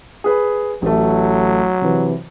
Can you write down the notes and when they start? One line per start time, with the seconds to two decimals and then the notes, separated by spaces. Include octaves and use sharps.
0.24 G#4 B4
0.82 A1 F#3 A3
1.82 C3 E3